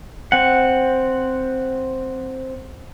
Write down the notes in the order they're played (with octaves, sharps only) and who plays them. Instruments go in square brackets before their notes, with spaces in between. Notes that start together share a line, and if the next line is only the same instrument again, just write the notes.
[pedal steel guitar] C4 F#5